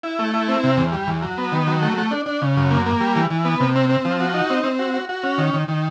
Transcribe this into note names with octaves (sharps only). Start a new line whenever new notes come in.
E4
A3
E4
C4
C3
E2
G3
E2
F#3
B3
D#3
F#3
A3
A3
D4
D4
C#3
F#2
A#3
A#3
G3
E3
E3
B3
C3
C4
C4
F3
F#4
D#4
C4
C4
F#4
F#4
F#4
C#4
D#3
D#3
D#3